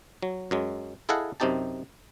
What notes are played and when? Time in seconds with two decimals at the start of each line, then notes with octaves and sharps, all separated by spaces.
0.23 F#3
0.51 F#2 F#3 G#3
1.09 E4 G#4 A4 D#5 F5 F#5
1.40 F#2 C3 C4 D#4 G4 A5